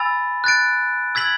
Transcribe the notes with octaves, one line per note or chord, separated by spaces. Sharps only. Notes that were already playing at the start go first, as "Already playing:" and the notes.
Already playing: G#5 B5 E6 A6
F#6 A6 D7
E6 G#6 B6 F#7